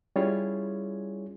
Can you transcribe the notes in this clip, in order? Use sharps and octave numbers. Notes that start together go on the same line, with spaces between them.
G3 C#4 E4 F4 G#4 C#5